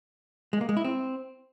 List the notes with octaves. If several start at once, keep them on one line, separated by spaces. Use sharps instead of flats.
G#3
A#3
G#3
E4
C4